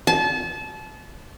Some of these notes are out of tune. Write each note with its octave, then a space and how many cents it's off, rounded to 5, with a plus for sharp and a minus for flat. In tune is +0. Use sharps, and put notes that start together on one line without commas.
A5 -30